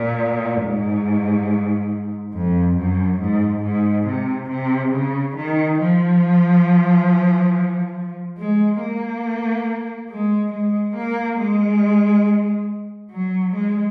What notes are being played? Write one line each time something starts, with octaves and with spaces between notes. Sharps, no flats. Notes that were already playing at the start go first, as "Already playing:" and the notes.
Already playing: A#2
G#2
F2
F#2
G#2
G#2
C3
C3
C#3
D#3
F3
G#3
A#3
G#3
G#3
A#3
G#3
F#3
G#3